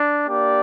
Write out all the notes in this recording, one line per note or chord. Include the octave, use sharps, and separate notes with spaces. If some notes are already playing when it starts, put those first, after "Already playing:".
Already playing: D4
A#3 D4 G4 D5